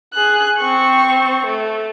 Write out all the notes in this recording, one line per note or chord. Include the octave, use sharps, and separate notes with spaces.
G#4 F#6
C4 C#6
A3